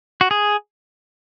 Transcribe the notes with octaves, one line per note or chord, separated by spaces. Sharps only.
F#4
G#4